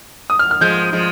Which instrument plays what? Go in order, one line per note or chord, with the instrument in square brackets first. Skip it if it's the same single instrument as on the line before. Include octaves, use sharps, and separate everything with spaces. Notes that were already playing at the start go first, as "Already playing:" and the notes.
[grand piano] D#6
F6
F6
[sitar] F3 G#3 [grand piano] G6
[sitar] F3 G#3